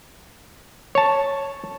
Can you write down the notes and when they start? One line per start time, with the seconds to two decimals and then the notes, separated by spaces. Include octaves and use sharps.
0.95 C#5 A5